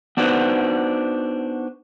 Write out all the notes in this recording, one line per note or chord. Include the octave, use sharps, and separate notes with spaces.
B3 D4 D#4 F#4 B4 C5